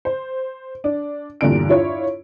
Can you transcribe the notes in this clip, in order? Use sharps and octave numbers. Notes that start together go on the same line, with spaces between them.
C5
D4
E2 G2 A#2 D3 D7
D4 E4 F4 C#5